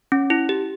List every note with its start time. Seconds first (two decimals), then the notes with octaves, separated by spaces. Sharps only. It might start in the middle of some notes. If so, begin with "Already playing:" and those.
0.12 C#4
0.30 E4
0.49 G4